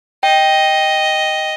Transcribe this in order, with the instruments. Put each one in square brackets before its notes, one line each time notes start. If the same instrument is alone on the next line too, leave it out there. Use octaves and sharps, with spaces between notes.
[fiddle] D#5 [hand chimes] G5